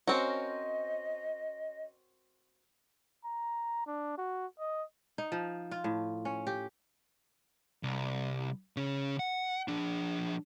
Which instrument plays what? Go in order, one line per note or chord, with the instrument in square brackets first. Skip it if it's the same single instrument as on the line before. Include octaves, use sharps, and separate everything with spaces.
[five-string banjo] C4 F#4 [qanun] C#4 A#4 C5 [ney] D#5
[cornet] A#5
D4
F#4
D#5
[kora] D#4
F3
F4
A2
C#4
G4
[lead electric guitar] C2
C#3 C#4
F#5
F3 D4